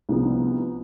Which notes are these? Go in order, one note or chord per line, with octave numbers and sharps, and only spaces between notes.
C2 C3 F3 B3 D4